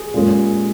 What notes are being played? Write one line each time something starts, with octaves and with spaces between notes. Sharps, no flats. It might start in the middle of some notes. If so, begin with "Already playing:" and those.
Already playing: G#4
A#2 G#3 C#4